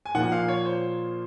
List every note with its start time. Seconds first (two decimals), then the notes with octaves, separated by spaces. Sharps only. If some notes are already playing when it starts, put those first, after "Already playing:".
0.06 G#5
0.15 A#2 F3 A#3 F4 F#5
0.32 F5
0.48 C#5
0.65 C5